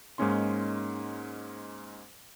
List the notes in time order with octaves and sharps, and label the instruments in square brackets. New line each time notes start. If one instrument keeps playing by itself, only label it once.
[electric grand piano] G#2 G#3 A#3 C#4 D#4 C6